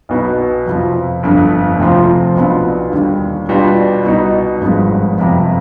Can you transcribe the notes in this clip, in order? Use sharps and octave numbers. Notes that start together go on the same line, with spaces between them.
B1 B2 B3 D#4
F2 C3 F3
G1 F2 D3
D2 C3 F3 C4 F4
B1 B2 B3 D4 F4
D#2 D3 G3
B2 G3 D4 F4
C2 B2 B3 D#4
G#1 G2 F3 G#3 B3
G1 F2 C3